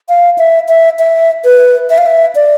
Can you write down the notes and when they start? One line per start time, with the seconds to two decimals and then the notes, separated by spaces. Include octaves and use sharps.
0.09 F5
0.38 E5
0.68 E5
0.99 E5
1.44 B4
1.90 E5
1.98 F5
2.06 E5
2.35 D5